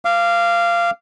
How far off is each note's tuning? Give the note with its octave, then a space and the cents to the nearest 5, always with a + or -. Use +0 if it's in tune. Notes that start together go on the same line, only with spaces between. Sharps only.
F5 -15 D6 +0